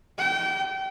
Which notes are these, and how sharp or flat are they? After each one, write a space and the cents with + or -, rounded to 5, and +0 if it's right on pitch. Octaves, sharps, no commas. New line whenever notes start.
G5 -30